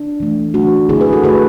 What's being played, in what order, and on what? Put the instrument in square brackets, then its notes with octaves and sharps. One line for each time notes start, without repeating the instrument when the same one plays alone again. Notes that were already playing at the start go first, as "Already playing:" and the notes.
Already playing: [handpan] D4
E3 A3
E3 A3 D4 F#4
D3 A3 E4 G#4
G#4 B4
F#4 A4
D3 A3 G#4 B4